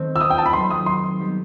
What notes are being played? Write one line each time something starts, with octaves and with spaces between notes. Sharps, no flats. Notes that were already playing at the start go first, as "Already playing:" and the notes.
Already playing: D#3 A3 C4 D#4
E6
D#6
G5
A5
B5
F#3 A3 D#4 A4 C6
D#6
C6
G3 B3 D#4 G4